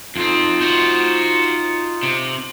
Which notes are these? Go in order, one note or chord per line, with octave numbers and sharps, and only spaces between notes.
F2 C4 D#4 F4
F#4 C5
C3